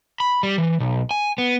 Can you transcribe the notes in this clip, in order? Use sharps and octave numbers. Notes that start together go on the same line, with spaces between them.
B5
G3
E3
B1
G#5
B3